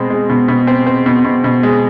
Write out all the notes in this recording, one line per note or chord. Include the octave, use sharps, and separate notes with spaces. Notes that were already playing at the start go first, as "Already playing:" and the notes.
Already playing: B2 G#3 C4
G#3
B2
B2
C4
C4
B2
B2
B2
G#3